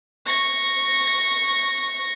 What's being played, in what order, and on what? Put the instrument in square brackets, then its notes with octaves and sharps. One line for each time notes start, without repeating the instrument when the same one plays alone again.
[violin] C#6 A#6